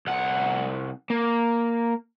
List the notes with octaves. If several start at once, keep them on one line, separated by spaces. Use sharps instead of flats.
C2 F#5
A#3